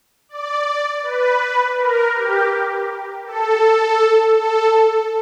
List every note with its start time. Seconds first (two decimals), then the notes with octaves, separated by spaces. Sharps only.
0.29 D5
1.03 B4
1.77 A#4
2.15 G4
3.26 A4
4.37 A4